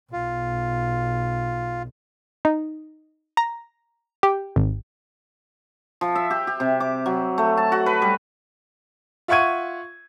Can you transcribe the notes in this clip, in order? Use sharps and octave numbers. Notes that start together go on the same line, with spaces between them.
B1 F4
D#4
A#5
G4
G#1
F3
E5
G4
G4
C3
D6
F#3
A3
A5
F#4
B4
G3
F4 E5 F#5 C#6 G#6 D#7